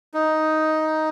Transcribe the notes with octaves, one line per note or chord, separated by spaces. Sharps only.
D#4